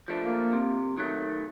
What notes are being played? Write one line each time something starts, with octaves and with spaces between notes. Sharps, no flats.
F3 A3 D4
A#3
C3
D#3 F#3 A3